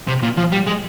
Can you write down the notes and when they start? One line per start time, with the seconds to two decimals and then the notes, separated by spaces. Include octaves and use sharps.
0.08 C3
0.23 A#2
0.38 F3
0.52 G3
0.67 G#3